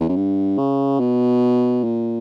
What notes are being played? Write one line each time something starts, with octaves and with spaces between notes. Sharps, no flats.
E2
F#2
G2
C#3
B2
A#2